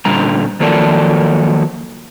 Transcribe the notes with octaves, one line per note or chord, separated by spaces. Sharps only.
A#2 D3 G3 A#5
D#3 F3 F#3 A#3 A4 D5